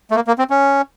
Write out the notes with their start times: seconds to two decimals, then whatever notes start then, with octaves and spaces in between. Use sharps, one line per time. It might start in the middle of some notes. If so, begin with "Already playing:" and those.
0.11 A3
0.15 A#3
0.27 A#3
0.39 C4
0.50 C#4